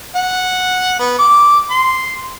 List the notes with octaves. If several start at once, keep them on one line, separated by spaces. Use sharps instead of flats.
F#5
B3
D6
C6